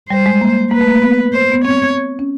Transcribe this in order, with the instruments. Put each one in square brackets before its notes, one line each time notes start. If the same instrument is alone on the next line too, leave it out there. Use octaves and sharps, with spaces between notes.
[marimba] G3 [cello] C5
[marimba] G#3
A#3
[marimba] A#3 [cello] B4
[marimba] A3
A#3
B3
[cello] C5
[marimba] B3
[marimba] C4 [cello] C#5
[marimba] C#4